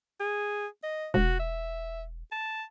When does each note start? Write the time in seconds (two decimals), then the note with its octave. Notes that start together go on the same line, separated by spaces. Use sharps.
0.20 G#4
0.83 D#5
1.14 E1 F#4
1.39 E5
2.32 A5